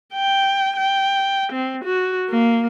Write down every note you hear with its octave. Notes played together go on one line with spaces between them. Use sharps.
G5
G5
C4
F#4
A#3